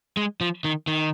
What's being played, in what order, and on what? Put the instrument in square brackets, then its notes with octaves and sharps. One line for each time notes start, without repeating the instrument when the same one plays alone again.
[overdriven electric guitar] G#3
F3
D#3
D#3